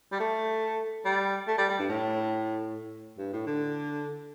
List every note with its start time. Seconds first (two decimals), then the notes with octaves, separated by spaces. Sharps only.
0.12 G3
0.20 A3
1.05 G3
1.48 A3
1.58 G3
1.69 G3
1.79 G2
1.90 A2
3.18 G2
3.33 A2
3.47 D3